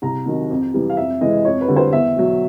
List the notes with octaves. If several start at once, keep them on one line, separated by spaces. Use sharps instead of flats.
C2 A#5
C3 D#3 F#3
F2
C3 E3 G3
F5
F2 E5
C3 E3 G#3 D#5
F2 C#5
B4
D3 G3
C5
E2 E5
B2 F#3